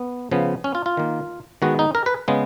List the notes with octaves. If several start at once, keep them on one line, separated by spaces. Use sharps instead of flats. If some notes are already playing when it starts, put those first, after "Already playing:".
Already playing: B3
C#3 F3 B3
C#4
F4
F4
D#3 A#3
D#3 G#3 B3 F#4
D#4
A#4
B4
C#3 G#3 B3